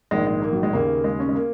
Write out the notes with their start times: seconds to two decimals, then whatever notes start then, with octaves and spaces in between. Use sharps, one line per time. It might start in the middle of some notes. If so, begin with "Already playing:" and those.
0.11 A#1 G#2 D#3 G#3
0.27 G#3
0.42 A#3
0.53 F#3
0.63 G#3
0.73 D#2 C#3 A#3
1.04 G#3
1.20 C#4
1.29 G#3
1.35 A#3